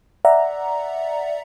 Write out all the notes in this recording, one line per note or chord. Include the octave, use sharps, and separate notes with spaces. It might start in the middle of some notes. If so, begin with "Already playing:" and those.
D5 E5 F#5 A#5